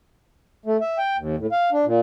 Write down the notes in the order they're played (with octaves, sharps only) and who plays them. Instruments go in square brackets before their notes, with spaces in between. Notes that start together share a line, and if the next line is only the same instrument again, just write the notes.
[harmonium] A3
E5
G5
D#2
A2
F5
D4
A#2